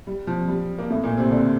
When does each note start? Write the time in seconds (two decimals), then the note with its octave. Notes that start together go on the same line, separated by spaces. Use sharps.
0.07 G3
0.27 F3
0.48 G3
0.79 A#3
0.90 A2 A3
1.03 A#2 A#3
1.18 C3 C4
1.31 D3 D4